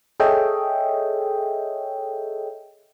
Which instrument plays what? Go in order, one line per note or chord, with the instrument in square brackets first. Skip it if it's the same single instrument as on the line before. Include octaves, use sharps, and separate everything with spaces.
[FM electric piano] G#4 A4 C#5 D#5 E5 G5